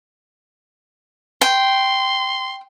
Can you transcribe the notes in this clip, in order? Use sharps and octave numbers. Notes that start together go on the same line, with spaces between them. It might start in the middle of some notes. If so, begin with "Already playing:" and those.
G5 C6